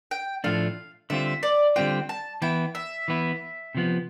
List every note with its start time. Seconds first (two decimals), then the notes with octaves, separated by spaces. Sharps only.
0.11 G5
0.44 A2 F3 A3 D4 F5
1.10 D3 G3 C4 F4 E5
1.43 D5
1.76 D3 G3 C4 F4 G5
2.09 A5
2.42 E3 B3 E4 G5
2.75 E5
3.08 E3 B3 E4
3.75 C3 F3 B3